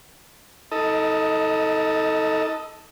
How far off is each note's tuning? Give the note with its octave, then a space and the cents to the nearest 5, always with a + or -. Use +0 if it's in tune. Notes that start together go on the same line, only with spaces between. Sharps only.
D#4 +35 A4 +5 D#5 +5